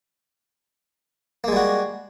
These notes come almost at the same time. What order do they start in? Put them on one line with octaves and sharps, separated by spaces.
A#3 G#3 G3 F#4